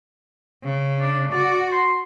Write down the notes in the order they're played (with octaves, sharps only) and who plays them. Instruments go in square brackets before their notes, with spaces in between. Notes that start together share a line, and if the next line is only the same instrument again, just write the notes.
[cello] C#3
[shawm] D4
[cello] F#4 [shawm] D5
[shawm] C6